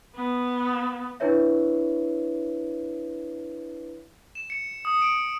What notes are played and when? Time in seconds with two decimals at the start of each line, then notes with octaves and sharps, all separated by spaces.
0.16 B3
1.20 D4 E4 B4 C#5 E5
4.35 E7
4.50 C#7
4.85 D#6
5.02 D7